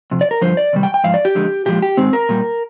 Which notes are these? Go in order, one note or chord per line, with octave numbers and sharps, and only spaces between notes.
F2 C3
D5
A#4
G2 D3 F3 C5
D5
C3 D#3 G3
G5
G5
G#2 F3 F5
D5
G4
F2 D3 G#3
A#2 F3 G#3 G4
G4
G#2 D#3 G#3 C4
A#4
A#2 G3